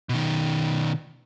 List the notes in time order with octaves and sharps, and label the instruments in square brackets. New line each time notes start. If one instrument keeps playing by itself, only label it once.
[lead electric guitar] B2 D#3